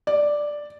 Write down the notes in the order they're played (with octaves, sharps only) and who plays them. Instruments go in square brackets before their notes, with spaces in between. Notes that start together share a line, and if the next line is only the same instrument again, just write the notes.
[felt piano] D5